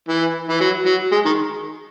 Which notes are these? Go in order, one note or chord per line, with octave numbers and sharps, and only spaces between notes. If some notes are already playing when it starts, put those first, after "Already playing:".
E3
E3
F#3
F#3
G#3
D#3